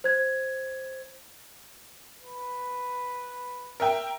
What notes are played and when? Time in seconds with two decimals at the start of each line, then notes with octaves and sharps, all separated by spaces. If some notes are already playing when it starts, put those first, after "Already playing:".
0.04 C5 G#6
2.22 B4
3.80 A#4 E5 G5